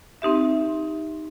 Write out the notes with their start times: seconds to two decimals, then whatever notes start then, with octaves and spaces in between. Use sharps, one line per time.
0.22 C4 D#4 G4 E5